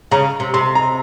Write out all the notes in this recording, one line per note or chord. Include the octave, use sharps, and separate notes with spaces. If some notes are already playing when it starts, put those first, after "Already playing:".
C#3 A#5
C3
C3 C6
A#5